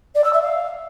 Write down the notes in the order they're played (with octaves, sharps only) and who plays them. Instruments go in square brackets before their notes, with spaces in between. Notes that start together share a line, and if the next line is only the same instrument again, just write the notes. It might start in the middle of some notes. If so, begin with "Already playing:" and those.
[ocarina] D5
E6
E5
F5